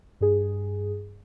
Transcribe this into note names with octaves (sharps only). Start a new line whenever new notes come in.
G2 G#4